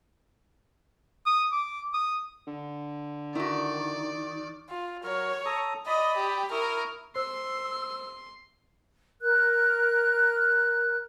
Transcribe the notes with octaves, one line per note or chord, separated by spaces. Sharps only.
D#6
D6
D#6
D3
D#3 E4 F#4 D5
F4
F#3 A#4 C#5
A4 A#5 D#6
D5 D#5 B5 D#6
G4
E4 A#4 C#6 D#6
C5 C6 E6
A#4 F#6